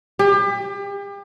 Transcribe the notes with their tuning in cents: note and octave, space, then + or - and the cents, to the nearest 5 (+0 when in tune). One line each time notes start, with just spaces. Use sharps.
G4 +35